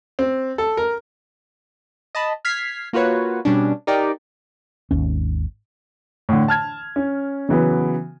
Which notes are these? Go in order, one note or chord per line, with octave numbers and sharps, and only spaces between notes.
C4
A4
A#4
D#5 A5 B5
F6 G#6 B6 C7
A#3 F4 F#4 B4 C#5
B2 G3 C#4 D4
D#4 G4 A#4 D5 G5
G#1 D#2 C#4
A2 D3
A5 F6 G#6
C#4
C#3 E3 F#3 B3